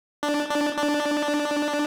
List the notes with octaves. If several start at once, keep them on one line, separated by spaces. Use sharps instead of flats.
D4
D4
D4